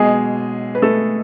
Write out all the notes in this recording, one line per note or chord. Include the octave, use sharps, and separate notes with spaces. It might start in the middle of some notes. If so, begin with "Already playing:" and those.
Already playing: B1 B2 G#3 G#4
B4
A3 A4